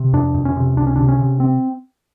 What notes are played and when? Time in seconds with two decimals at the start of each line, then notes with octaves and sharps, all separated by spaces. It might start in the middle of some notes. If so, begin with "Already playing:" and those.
Already playing: C3
0.13 F2 D4
0.34 F2
0.45 C#4
0.56 C3
0.77 C#2 D4
0.87 C#4
0.96 C3 D4
1.08 C#4
1.19 C3
1.40 C4